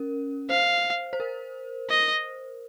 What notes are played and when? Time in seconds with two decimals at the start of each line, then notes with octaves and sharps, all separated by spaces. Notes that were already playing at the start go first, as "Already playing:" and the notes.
Already playing: C#4 A#4
0.49 C5 F5
1.13 C5
1.20 A#4
1.90 D#5